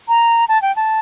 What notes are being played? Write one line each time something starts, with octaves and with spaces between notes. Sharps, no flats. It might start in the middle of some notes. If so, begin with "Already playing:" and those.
A#5
A5
G5
A5